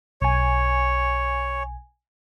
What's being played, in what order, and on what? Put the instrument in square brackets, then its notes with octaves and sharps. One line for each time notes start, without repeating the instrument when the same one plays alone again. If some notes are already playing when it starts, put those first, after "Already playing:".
[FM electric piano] B1 G#5 [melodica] C#5